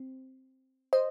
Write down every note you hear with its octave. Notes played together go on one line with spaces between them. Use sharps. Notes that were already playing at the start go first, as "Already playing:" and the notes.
Already playing: C4
C5 D#5